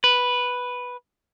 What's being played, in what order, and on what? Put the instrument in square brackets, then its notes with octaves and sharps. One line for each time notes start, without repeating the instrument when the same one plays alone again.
[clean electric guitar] B4